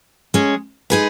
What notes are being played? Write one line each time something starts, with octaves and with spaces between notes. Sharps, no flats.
G#3 C#4 G#4
G#3 D#4 G#4 B4